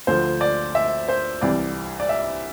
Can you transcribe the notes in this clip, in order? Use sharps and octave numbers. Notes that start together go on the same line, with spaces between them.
D2 D3 F3 C5
D5
E5
C5
C2 C3 E3 D5
D5
E5